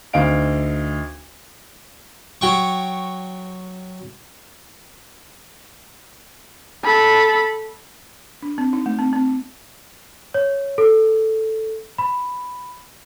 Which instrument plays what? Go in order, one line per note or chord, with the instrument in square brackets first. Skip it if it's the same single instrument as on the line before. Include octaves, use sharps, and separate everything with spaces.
[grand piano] D2 D#4 F5 D7
[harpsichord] F#3 G5 C#6
[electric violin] A4 B5
[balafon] D4
C4
D#4
A3
C4
C4
[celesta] C#5
A4
B5